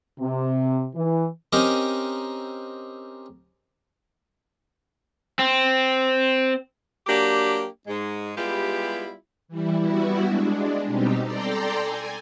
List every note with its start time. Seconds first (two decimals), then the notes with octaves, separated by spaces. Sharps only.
0.20 C3
0.95 E3
1.53 C4 C#4 D#4 G4 A#4
5.39 C4
7.07 F#3 A#3 D4 G4
7.87 G#2 G#3
8.36 G3 G#3 B3 E4 F4 G4
9.48 E3 G3 E4
9.79 G3 B3 E4 F#4
10.23 G#3 D4
10.86 B2 G3 C4 D#4 G4
11.23 A4 D5 G5 A#5 C6
11.80 G#5